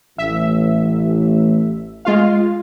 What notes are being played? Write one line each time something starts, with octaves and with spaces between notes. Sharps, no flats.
A1 E5
G#3 F4 F5